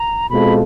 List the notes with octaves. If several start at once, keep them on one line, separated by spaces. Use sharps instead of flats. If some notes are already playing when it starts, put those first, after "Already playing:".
Already playing: A#5
B2 G#3 C4 F4 A4 B5